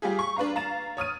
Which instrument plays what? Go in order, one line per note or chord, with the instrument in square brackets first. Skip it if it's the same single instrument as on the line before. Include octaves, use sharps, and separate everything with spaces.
[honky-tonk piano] G3 F4 G4 G#4
C#6
D4 B4 F5 A#5
F5 A#5 A6 E7
C#5 D#6 F6 D#7